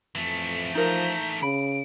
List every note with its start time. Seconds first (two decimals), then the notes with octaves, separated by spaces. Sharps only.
0.15 F2 E3 A3
0.75 F3 D#4 A#4 A#5 G6
1.42 C#3 B5 D7